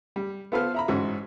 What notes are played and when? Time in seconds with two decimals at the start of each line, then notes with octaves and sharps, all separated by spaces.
0.16 G3
0.52 B3 F4 A4 B4 C5 F5
0.74 E4 A#5 B5
0.88 A1 G#2 C#4 F#4